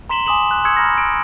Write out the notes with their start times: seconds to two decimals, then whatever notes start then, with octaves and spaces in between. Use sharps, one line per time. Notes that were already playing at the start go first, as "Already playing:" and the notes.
0.09 A#5 C6 B6 E7 F#7 G7
0.26 G#5 C6 D6 D#6 E7 F#7
0.51 F#6
0.64 C6 C#6 D#6 E6 G#6 C#7
0.76 A#5 B5 F6 G#6 A#6
0.98 D7